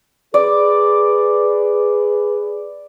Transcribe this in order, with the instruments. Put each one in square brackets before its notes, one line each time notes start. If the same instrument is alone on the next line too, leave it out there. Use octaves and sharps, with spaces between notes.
[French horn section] G#4 B4 [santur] D5